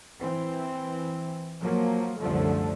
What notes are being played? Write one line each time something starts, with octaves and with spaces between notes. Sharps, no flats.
E3 C4
F3 F#3 A#3
C2 F#2 D3 F3 A3